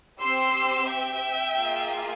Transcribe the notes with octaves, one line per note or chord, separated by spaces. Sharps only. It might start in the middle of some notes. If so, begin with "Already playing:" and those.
C4 G4 C6 E6
E5 G5
A#3 F4 G#4